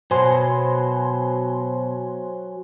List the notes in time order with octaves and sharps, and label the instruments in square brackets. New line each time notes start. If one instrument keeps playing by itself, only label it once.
[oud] B2 [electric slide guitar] F#3 [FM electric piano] C5 G#5 C6